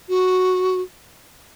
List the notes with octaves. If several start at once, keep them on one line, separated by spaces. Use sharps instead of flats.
F#4